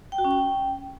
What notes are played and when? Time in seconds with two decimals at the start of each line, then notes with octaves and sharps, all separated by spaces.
0.12 G5
0.18 F#4
0.25 C#4
0.31 G5